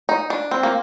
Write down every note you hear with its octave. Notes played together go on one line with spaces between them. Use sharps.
D#4
D4
C4
A#3